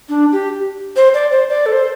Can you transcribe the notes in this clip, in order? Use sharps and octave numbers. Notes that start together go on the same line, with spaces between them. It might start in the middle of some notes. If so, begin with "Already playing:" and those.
D4
G4
C5
D5
C5
D5
A4
C5